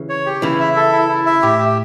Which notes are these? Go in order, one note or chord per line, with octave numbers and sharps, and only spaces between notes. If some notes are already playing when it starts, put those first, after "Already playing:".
Already playing: C#3 E3
C#5
G4
C#3 E3 E4
E5
A4
E4
E4
E5
A2 G4
G4